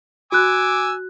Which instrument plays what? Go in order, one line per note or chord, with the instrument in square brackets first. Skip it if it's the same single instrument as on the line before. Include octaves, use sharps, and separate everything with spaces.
[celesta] F#4 F#6 [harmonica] G#5 D6 E6